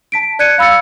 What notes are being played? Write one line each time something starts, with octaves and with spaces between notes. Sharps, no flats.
A5 B6 D7
D5 F#6 G#6 C#7 D#7
F5 B5 E6 A6 C#7